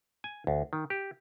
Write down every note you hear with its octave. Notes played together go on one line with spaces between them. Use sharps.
G#5
D2
D#3
G4